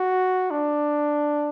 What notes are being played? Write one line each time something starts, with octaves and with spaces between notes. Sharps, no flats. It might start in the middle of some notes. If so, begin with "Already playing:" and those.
Already playing: F#4
D4